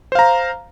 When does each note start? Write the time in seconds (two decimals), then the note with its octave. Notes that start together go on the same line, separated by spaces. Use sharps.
0.12 C5
0.15 F5
0.19 A#5